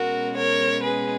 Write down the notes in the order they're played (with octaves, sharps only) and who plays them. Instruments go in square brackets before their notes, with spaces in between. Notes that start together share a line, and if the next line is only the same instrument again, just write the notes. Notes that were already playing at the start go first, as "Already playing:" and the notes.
Already playing: [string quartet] B2 G#3 C#4 F#4 A#4
A#4 C#5
G#4 B4